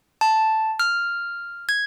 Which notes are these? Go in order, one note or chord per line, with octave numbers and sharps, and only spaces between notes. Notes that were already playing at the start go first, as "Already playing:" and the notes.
A5
F6
G#6